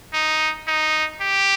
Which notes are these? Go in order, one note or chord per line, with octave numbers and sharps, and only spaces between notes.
D#4
D#4
G4